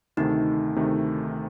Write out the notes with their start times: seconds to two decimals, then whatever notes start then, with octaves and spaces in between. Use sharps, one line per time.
0.17 D2 C3 D#3 A3 D#4
0.76 D2 C3 D#3 A3